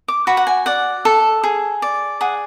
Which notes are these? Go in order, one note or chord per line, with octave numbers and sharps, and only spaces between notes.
D6
F#4 B5
F#5
G#5
D5 F#5
A4
G#4
D5
G#4 F#5